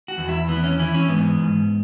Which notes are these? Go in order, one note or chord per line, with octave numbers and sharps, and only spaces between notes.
F#4
E2
E4
E3 B3
C#4
E3 E4
C#4
G#2 B3
G#2